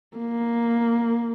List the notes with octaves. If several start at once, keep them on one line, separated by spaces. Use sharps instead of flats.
A#3